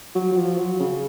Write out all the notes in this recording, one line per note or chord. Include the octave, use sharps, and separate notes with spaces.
F#3
F#3
F3
F#3
C#3